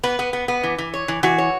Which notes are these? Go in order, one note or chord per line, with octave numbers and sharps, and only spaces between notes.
B3 B4
B3
B3
B3
E3
E3
C#5
E3
E3 F#4
C#5